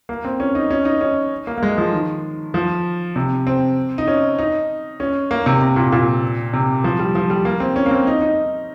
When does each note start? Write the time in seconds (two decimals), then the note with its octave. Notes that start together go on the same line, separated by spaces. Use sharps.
0.09 A#3
0.25 C4
0.40 C#4
0.55 D#4
0.71 C#4
0.85 D#4
1.01 C#4
1.47 A#3
1.58 A#3
1.63 G#3
1.78 F3
1.93 D#3
2.54 F3
3.16 C3
3.47 C4
3.98 D#4
4.08 C#4
4.39 D#4
5.00 C#4
5.31 A#3
5.46 C3
5.61 C3
5.76 A#2
5.92 A#2
6.53 C3
6.84 F3
6.99 G3
7.15 F3
7.30 G3
7.45 A#3
7.60 C4
7.76 C#4
7.86 A#3
7.91 C4
8.07 D#4
8.22 D#4